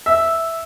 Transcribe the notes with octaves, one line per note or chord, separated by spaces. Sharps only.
E5